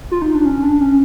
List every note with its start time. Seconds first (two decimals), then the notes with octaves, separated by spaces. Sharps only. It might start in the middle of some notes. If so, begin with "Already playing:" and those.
0.11 F4
0.22 D#4
0.35 D4
0.45 C#4
0.63 D4
0.80 C#4